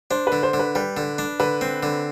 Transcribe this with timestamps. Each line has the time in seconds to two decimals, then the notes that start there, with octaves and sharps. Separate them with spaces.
0.11 D4 C5
0.27 B4
0.32 D3
0.43 C5
0.54 D3
0.59 B4
0.75 G3 B4
0.97 D3
1.18 D4
1.40 D3 B4
1.61 C4
1.83 D3